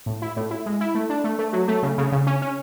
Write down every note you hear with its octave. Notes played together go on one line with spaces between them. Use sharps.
A2
E4
A2
E4
G#3
E4
A3
D4
A3
A3
F#3
A3
C#3
C#3
C#3
C#4
C#4